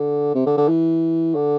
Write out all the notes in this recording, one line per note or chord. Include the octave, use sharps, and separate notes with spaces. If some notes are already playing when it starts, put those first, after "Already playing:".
Already playing: D3
C3
D3
D3
E3
D3